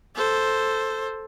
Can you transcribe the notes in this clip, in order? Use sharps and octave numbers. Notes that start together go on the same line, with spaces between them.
A4 C5